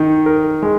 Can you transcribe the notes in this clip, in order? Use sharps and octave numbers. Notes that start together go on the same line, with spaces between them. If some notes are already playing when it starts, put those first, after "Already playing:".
Already playing: D#3 D#4
A#4
G#3